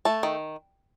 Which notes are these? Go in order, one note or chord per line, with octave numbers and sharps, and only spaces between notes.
A3 A5
D#3